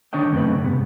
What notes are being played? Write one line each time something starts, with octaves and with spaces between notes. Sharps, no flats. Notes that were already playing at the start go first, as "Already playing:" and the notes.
D#3 D4 C#5 D#5 G5
F#2 C#3 A3 C4 G4 B4
G#2 C3 B3